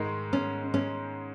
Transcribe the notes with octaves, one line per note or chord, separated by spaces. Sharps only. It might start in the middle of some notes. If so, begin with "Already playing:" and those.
Already playing: G#2 D#3 G#3
C#4
C#4